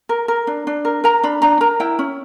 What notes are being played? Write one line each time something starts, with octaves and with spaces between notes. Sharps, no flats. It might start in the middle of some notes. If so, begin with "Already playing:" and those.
A#4
A#4
D4
D4
A#4
A#4 A#5
D4 B5
D4 A#5
A#4 A#5
E4 G5
C#4